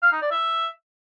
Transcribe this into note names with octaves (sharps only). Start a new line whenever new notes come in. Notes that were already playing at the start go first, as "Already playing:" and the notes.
F5
D#4
D5
E5